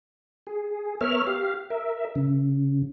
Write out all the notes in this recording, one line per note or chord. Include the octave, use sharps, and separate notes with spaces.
G#4
B3 A#4 C#5 E5 F6
G4 F5
A#4 E5
C#3